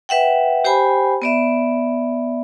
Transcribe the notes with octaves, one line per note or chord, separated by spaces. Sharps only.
B4 E5 F#5 G5
G4 C5 G5 G#5 B5
B3 D5 E5